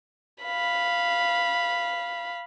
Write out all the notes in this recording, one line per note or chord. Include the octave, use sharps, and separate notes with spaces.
F5 B5